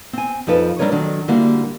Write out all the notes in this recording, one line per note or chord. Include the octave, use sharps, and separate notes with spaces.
C4 G#5
F2 F3 D#4 A4 B4
G3 C4 D4 A#4 C#5 D#5
D#3 F#3 D4 A4
D3 G3 A#3 D4 E4 F#4